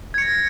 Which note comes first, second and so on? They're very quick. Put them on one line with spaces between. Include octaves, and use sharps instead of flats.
G#6 C#7 A#6